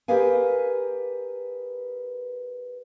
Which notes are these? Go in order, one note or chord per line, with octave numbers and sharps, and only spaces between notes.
G4 A#4 B4 D#5 F5 G#5